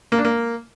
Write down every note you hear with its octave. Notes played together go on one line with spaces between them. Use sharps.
A#3
D4
A#3